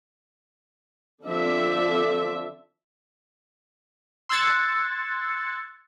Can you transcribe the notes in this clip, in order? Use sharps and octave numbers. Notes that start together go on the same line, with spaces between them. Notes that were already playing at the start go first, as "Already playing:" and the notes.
D3 F3 C4 D5 E5
C6 E6 F#6 G#6 A6 C#7